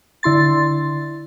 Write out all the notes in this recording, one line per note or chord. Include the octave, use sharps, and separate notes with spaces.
D3 E4 C6 A6